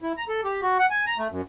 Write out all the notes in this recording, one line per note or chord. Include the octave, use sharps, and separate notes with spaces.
E4
A#5
A4
G4
F#4
F#5
G#5
A#5
A3
F#2